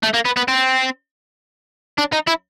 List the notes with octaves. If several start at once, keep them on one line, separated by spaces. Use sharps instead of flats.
A3
A#3
B3
B3
C4
D4
D#4
E4